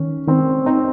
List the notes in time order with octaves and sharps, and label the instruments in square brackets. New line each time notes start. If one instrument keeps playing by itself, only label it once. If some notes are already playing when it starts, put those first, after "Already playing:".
Already playing: [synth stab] D#3 [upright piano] C#4
[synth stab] D#3 [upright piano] C4
[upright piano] C4 [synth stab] D#4